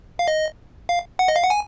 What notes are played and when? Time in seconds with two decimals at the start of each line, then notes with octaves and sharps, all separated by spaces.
0.19 F5
0.28 D#5
0.89 F5
1.19 F#5
1.28 D#5
1.36 F5
1.43 F#5
1.50 G#5